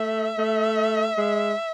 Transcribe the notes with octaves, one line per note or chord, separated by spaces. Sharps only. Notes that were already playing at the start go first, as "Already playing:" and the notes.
Already playing: A3 E5
A3
G#3